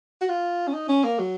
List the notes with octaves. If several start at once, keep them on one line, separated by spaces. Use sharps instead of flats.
F#4
F4
C#4
D#4
C#4
A#3
F#3